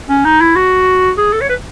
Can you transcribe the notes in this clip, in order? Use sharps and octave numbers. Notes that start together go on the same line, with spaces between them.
C#4
D#4
E4
F#4
G#4
A4
C#5
B4